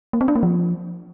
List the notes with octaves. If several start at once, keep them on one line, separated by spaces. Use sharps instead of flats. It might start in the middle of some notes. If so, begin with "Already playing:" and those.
A#3
C4
D4
A#3
F3